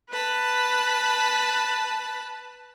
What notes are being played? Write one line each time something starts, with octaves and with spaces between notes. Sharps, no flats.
B4 A5 B5